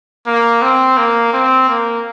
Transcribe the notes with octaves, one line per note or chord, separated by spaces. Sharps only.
A#3
C4
A#3
C4
A#3